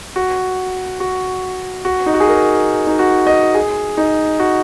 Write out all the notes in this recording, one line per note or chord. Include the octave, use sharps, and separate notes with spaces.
F#4
F#4
F#4
D#4
F#4
G#4
A#4
D#4
F#4
D#5
G#4
D#4
F#4